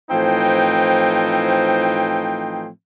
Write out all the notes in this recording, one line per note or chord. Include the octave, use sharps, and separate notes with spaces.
A2 E3 F3 C4 D#4 G5